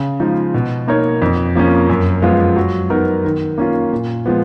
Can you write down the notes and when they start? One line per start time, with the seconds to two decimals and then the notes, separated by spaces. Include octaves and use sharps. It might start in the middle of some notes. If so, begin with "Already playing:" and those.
Already playing: C#3
0.20 F3 G#3 D#4
0.54 B2
0.88 A#3 D#4 A#4 C#5
1.22 F2
1.55 F3 A#3 C#4
1.89 F#2
2.22 F3 G#3 B3 F4
2.56 F#3
2.90 B3 D#4 A#4
3.25 D#3
3.58 A#3 C#4 F4
3.92 A#2
4.26 F3 G#3 B3